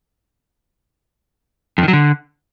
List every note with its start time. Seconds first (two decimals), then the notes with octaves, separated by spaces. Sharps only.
1.78 F2
1.83 D#3
1.88 F#3
1.93 D3